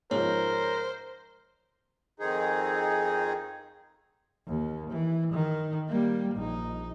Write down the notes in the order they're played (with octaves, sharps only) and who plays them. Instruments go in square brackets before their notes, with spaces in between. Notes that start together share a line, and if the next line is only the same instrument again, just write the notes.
[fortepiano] G#2 C#3 F3 [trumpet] A#4 [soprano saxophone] C5 [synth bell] C#5
[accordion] F2 D#3 C4 D#4 G#4
[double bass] D#2
E3
D#3
G3 A#3
A#1 D#4